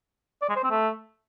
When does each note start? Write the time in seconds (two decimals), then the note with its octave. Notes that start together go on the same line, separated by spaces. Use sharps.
0.42 D5
0.49 G#3
0.56 C5
0.63 C4
0.70 A3